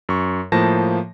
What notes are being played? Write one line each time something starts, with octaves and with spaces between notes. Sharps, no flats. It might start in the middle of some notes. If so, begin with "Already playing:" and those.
F#2 C#6
A2 F3 A#3 A5 A#6